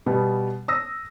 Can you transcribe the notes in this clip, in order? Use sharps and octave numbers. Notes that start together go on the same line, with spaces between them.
B2 G3 B3
D#6 E6 A#6